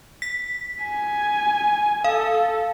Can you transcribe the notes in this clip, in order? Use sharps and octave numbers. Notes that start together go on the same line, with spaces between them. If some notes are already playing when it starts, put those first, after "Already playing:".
B6
G#5
A4 F5